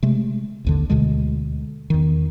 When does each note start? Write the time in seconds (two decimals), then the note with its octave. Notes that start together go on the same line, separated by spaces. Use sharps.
0.03 C3 G#3 A3
0.65 A1 D#2 D3
0.90 D2 B2 D3 G#3
1.90 E2 D#3